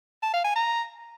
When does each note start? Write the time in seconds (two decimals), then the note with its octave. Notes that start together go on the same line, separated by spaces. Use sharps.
0.22 A5
0.33 F5
0.44 G#5
0.55 A#5